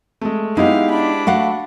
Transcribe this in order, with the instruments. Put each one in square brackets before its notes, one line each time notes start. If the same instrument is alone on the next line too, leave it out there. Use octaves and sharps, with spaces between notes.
[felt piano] G#3 A3
[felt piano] G#3 E4 G4 [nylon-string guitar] B3 D#4 [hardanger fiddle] F5
[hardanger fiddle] D4 B5
[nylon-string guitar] A3 F5 F#5 [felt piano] F#4